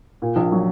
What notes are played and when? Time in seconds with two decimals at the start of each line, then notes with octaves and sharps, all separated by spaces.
0.22 A#2
0.36 A#1
0.52 F#3